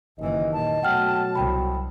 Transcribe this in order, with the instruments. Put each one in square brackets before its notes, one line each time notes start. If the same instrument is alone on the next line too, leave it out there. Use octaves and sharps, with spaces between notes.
[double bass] F#1 E3 [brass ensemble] D#2 D#3 D#5
[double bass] A#2 [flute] A5
[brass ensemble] B2 F#3 [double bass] A3 [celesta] F#5 G5 F6
[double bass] C2 [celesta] G5 B5